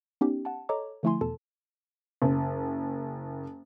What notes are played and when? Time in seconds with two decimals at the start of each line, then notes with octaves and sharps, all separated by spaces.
0.21 B3 C#4 D#4 G4
0.45 F#5 A5
0.69 A4 C#5 D#5 A#5 D6
1.03 D3 F3 A3 E4 G#5 C6
1.21 E2 B2 A4 A5
2.22 F#1